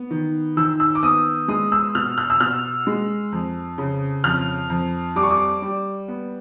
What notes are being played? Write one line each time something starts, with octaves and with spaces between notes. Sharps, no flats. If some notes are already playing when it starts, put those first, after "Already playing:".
Already playing: B3
D#3
D#3 E6
E6
D6
B3 D#6
G#3 D#6
E6
B2 F6
F6
E6
B2 F6
G#3
F2
C#3
F2 F6
F2
G3 D6
C#6
D6
G3
B3